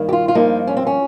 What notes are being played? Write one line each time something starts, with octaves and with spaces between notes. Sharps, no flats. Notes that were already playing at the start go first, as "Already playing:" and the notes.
Already playing: G2 D#3 A#3
G4
F4
F4
G2 F3 A#3 D#4
C#4
C4
C#4